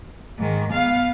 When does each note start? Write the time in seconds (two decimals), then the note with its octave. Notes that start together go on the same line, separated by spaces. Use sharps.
0.37 G#2 D#3
0.72 B3 F5